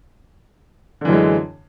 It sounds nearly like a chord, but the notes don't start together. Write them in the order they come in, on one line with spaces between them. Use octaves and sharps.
D3 E3 F#2 G#3